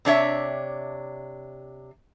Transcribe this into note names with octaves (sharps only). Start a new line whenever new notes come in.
C3 D4 C#5 E5